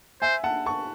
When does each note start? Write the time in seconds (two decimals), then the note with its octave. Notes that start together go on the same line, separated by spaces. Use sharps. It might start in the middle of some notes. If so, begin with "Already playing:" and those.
0.22 C5 E5 G#5
0.44 F#5 A5
0.66 A5 C#6